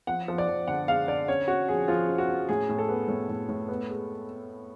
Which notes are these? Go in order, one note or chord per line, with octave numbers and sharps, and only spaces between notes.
F3 F#5
F3
D5
F3
D3 F#5
G#3 F5
D3 D5
C#4 C#5
C#4 F#4
F3 G#4
F3 F4
C#4
F#4
C#4
A2 G#4
A2
A4
B3
A2
A2
A2
B3
G#3